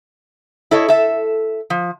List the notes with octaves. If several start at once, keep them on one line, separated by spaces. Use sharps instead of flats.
E4 A4 C#5 D#5
A4 E5
F3